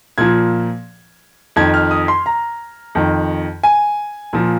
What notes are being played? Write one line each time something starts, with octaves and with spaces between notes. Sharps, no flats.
A#2 F3 G#6
F2 D#3 G#6
F6
D#6
C6
A#5
F2 D#3
G#5
A#2 F3